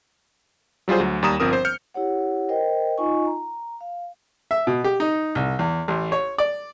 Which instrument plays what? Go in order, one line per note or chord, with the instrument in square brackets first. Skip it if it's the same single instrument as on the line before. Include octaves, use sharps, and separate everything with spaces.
[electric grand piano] F#3 G3 F4 G#4 C5
D2 F#3
D#2 G3 A#5 D#6 E7
G1 F3 C4 A#4 D#6
C5
F6 G6 C#7
[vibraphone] E4 G4 C#5 F#5
A#4 C5 D#5 G5
D#4 F4 D#5 G#5 C#6
A#5
F5
[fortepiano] E5
B2
G4
D#4
C2
E2
A1
C#5
D5